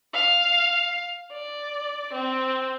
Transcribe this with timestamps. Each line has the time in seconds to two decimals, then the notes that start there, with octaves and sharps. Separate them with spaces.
0.14 F5
1.32 D5
2.13 C4